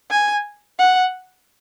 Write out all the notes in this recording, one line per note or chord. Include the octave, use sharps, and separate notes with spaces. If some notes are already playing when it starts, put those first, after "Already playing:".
G#5
F#5